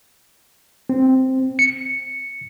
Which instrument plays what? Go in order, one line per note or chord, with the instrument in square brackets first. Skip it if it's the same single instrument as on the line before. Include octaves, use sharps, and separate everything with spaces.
[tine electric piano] C4
C#7